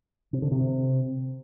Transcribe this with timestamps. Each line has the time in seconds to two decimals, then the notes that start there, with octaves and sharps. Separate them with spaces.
0.33 C3
0.42 D3
0.52 C3